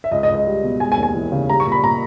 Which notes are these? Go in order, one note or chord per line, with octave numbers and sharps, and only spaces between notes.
E5
C#2 D#5
D#5
C#2
D#5
G3
B2
G#3 G#5
G#5
D#2
G#5
E3
C#3
G3 A#5
C#6
A#2
B5
A#2 A#5